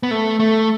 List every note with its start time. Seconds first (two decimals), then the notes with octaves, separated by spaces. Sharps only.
0.03 B3
0.11 A3
0.40 A3